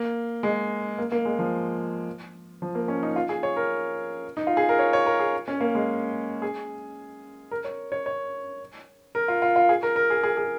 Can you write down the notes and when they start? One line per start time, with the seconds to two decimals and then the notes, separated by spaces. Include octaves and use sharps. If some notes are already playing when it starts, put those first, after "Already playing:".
Already playing: A#3
0.43 G#3
0.98 A#3
1.12 A#3
1.25 G#3
1.39 F3
2.62 F3
2.75 A#3
2.88 C#4
3.03 D#4
3.16 F4
3.29 G#4
3.43 C#5
3.56 A#4
4.37 D#4
4.47 F4
4.57 G#4
4.69 A#4
4.79 C#5
4.93 C#5
5.06 A#4
5.20 G#4
5.48 C#4
5.60 A#3
5.75 G#3
6.42 G#4
7.51 A#4
7.64 C#5
7.92 C#5
8.06 C#5
9.15 A#4
9.28 F4
9.42 F4
9.56 F4
9.69 G#4
9.83 A#4
9.96 A#4
10.10 G#4
10.23 G#4
10.37 G#4